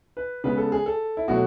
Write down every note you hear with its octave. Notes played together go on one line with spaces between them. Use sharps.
B4
C#3 G#3 B3 B4
A4
G#4
A4
E4
B2 F#3 A3 F#4